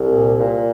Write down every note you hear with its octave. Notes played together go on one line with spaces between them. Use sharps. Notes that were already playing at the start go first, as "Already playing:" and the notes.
Already playing: C2
A#2
A#2